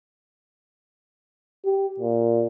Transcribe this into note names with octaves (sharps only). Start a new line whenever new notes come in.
G4
A#2